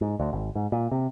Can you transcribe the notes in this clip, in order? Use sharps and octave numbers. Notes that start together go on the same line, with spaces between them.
G#2
D2
G#1
G#2
A#2
C3